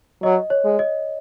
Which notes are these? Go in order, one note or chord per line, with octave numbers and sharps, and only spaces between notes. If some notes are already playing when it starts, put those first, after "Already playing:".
F#3 D#5
C#5
G#3
D#5